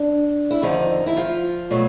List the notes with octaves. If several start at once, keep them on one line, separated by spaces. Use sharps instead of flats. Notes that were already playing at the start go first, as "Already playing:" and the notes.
Already playing: D4
E4
F2 D3 D#3 F3 D#4
E4
F3 F4
B2 F#3 A3